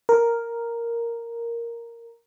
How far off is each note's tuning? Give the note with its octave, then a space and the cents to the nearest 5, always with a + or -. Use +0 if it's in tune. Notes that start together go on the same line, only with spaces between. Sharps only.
A#4 +0